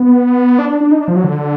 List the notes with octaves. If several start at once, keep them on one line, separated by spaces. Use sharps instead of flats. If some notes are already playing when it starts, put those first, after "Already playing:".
Already playing: B3
D4
D4
D4
D#4
D4
F3
F#3
D3